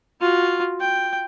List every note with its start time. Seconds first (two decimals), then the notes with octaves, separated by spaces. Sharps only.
0.21 F4 F#4
0.80 G5